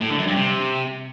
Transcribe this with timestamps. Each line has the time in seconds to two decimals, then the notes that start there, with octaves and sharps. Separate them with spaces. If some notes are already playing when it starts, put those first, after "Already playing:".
0.01 A2
0.09 D3
0.18 F#2
0.27 G2
0.36 C3